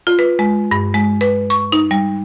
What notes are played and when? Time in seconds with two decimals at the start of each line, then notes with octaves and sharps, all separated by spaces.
0.07 F4
0.19 B4
0.39 G#3
0.71 G2
0.94 G#3
1.21 B4
1.50 C#6
1.72 D#4
1.91 G3